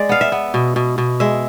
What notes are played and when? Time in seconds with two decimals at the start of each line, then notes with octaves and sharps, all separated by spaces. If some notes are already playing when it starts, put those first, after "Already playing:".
Already playing: G#3 D5
0.09 B3 F5
0.21 E5
0.32 B3
0.54 B2
0.76 B2
0.98 B2
1.20 G#3 E5